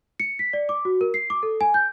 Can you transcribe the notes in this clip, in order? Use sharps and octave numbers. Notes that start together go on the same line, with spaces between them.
C#7
B6
D5
D6
F#4
A#4
C7
D6
A4
G#5
G6